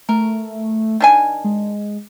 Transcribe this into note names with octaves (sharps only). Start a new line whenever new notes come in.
A3 A#4
D#3 D4 G#5
G#3